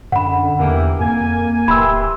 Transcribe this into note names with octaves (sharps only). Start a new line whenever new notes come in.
F#2 D3 F#5 B5
E2 E3 A#3 G4
F2 A#3 G#5
D1 E3 G4 B5 C6 E6